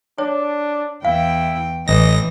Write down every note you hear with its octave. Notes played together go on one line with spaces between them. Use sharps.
D4 C#5
E2 E4 F5 G5
A1 E3 D#5 A#6